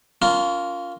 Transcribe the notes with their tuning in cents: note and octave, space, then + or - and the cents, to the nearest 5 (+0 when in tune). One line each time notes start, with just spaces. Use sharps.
C#4 +35 F4 +0 A#4 +0